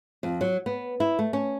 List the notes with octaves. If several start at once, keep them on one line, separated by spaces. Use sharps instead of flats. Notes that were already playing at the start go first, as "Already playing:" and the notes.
F2
F#3
B3
E4
A3
C#4